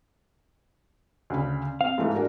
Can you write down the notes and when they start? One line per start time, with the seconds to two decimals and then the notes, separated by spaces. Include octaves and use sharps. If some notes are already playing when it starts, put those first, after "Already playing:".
1.30 D2 C#3 B5
1.81 C4 F5
1.98 G#2 E3 A3
2.14 D4 F#4 A#4